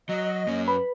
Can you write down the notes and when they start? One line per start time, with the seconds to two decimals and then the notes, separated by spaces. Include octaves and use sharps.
0.09 F#3 D#5
0.47 F#2 A#3 C#4
0.68 B4 B5